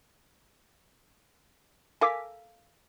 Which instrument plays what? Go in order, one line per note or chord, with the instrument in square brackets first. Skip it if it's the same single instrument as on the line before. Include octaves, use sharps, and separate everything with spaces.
[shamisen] A4 A#4 F5 [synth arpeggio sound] G#5 D6 B6